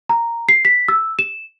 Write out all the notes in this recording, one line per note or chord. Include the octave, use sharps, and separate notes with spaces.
A#5
C7
B6
E6
E7